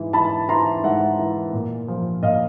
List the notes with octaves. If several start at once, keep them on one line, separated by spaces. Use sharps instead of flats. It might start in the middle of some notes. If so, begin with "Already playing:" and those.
Already playing: G#2 E3
E3 A5 B5
E3 A#5 C6
G#2 E5 F#5
E3
A#2
F3
A#2 D#5 F5